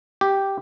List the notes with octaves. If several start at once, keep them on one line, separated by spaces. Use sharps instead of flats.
G4